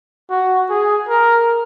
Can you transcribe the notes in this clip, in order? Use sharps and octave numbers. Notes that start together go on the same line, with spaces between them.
F#4
G#4
A#4